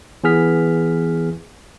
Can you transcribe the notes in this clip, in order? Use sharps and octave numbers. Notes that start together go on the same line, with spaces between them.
E3 B3 G#4 F6 B6